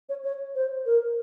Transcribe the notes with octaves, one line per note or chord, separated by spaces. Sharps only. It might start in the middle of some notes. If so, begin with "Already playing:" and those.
C#5
C#5
C5
A#4